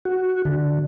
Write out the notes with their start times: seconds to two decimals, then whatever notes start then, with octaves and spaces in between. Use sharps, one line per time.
0.05 F#4
0.45 D3